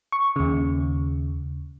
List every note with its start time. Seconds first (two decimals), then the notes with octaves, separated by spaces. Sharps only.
0.12 C#6
0.36 D#2 C#3